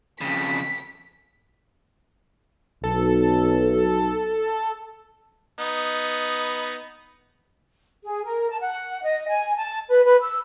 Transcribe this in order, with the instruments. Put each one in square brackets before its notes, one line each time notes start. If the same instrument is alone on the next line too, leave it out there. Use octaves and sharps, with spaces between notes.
[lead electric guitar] F2 C#3 [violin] B6
[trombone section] B1 [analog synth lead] A4
[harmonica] B3 D#4
[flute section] G#4
A#4
A5
F#5
D#5
G#5
A5
B4
B4
E6